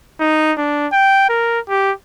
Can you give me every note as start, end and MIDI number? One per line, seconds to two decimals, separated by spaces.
0.20 0.52 63
0.58 0.87 62
0.93 1.29 79
1.29 1.59 70
1.69 1.91 67